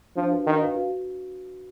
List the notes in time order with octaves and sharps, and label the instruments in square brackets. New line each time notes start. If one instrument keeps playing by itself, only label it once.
[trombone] F3 [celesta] D4
[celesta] F#4 B4 F5
[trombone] D#3 [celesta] D4
[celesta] F#4 B4 F5
F#4